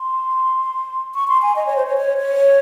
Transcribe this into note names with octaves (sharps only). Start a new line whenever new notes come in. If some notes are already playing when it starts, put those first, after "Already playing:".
Already playing: C6
C#6
C6
G#5
D#5
C#5
C5
C#5
C#5
C#5